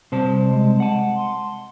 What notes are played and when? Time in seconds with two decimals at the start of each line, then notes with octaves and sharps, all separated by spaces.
0.12 C3 G3 C5 A5
0.50 G#3
0.80 F#5 A5
1.16 C6